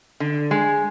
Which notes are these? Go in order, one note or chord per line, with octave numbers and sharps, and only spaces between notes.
D3
G#3